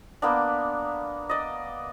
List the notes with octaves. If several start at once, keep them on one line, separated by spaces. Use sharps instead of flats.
A#3 B3 D4
D5 D#5